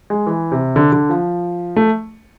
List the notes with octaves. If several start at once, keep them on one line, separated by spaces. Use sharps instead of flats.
G#3
E3
C3
D3
D3
F3
A3